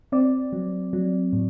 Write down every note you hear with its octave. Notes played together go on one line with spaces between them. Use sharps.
C4 D5
F#3
F#3
A2